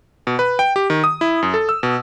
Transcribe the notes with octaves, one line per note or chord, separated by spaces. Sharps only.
B2
B4
G5
G4
D#3
D#6
E4
F#2
A4
E6
B2